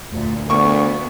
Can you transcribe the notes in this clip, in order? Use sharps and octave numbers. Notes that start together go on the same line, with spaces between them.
D2 A#2
D2 A#3 B3 C#6